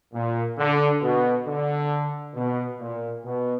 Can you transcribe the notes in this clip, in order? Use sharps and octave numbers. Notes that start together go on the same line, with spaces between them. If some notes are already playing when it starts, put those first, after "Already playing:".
A#2
D3
B2
D3
B2
A#2
B2